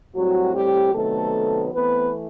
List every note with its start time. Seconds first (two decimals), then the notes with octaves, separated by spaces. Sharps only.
0.15 A2 F#3 G3 C4 F#4
0.54 G3 G4
0.93 C3 D#3 F#3 A3 B3 A4
1.71 E3 A3 B3 C4 B4